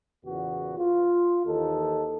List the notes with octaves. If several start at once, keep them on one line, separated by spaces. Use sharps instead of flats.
E2 A#2 C#3 B3 F#4
F4
D#2 E3 D#4 A4